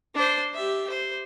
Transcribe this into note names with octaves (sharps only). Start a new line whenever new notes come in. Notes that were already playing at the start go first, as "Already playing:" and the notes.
D4 C5
G4 E5
C5